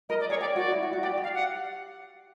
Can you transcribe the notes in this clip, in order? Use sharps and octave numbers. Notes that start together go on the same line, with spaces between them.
A#4 D#5
D5
G#4 C#5
G4 D5
F#4 D5
E4
F#4
F#4
G4 D5
G4
F5
F#5